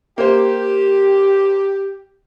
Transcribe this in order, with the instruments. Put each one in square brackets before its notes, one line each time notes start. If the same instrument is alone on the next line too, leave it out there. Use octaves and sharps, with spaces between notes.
[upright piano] A#3 C5 [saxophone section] G4